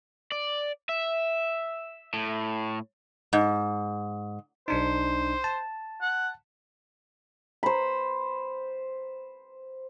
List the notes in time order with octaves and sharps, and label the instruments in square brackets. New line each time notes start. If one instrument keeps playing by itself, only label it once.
[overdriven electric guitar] D5
E5
A2
[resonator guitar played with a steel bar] G#2
[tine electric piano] B1 D4 D#4 [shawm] C5
[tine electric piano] A5
[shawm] F#5
[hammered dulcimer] C5 B5